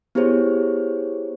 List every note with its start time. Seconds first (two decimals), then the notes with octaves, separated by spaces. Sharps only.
0.15 B3 E4 G4 G#4 C5 C#5